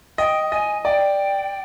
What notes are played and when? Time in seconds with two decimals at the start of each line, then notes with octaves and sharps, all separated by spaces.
0.18 D#5 G5
0.52 D#5 G#5
0.85 D5 G5